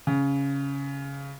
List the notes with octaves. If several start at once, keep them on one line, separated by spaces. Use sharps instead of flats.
C#3